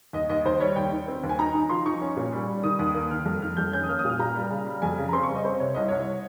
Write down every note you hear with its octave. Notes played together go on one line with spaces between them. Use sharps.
D#2 D#5
D#2 D#5
D#2 C5
G3 C#5
D#2 G5
D#3
C4
D#2
G#5
D#4 A#5
D#4
F3 C6
D#4 C#6
C#4
A#2
G3
G3
D#3 D#6
D#2 D#6
A#3 D#6
D#3 F6
F2
D#3 F6
F2 G6
C#4 G6
D#6
A#3 F6
D#6
A#2
F6
A#2 A#5
G3
C#3
G3
F2 G#5
C#3
A#5
C4 C6
C#6
G3
D#5
C4 C5
C3 C#5
C2 D#5
C2 C#5